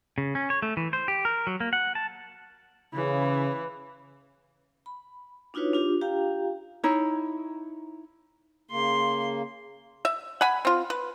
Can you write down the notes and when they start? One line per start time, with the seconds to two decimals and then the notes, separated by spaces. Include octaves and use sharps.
0.18 C#3
0.35 C#4
0.50 C#5
0.62 A3
0.77 E3
0.93 C5
1.08 G4
1.25 A#4
1.47 F#3
1.60 A#3
1.73 F#5
1.95 A5
2.94 C#3 E3
4.86 B5
5.54 D4 D#4 F4 F#4 B4 C#5
5.73 D4 F4 G4
6.01 F4 G4 F5 G5 A#5
6.84 D#4 E4 C#5
8.71 C#3 A#3 C6
10.05 E5
10.41 F#5 G#5 B5
10.65 C4 F4
10.90 B4